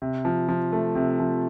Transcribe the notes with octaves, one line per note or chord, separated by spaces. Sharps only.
C3
F3
F3
A3
C3
F3